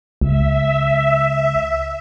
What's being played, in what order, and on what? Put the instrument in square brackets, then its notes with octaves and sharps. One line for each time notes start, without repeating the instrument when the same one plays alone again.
[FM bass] C#2 [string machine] E5